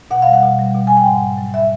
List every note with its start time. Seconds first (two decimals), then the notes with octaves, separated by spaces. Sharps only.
0.11 B2 F#5
0.22 F5
0.27 G3
0.33 F#5
0.43 B2
0.59 G3
0.74 B2
0.87 B2 G#5
0.97 G5
1.06 G#2 F#5
1.22 G#2
1.38 F#3
1.54 E5